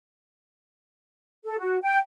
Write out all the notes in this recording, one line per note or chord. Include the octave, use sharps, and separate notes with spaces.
A4
F#4
G5